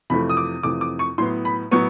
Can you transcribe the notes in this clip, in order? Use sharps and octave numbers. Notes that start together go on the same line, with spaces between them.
F2 C3 E3 A3 B5
D#6
D6
F2 C3 E3 A3 D6
D6
C#6
A2 F#3 B3 C6
B5
A2 F#3 B3 C#6